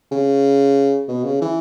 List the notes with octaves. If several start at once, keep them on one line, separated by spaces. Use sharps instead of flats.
C#3
B2
C#3
E3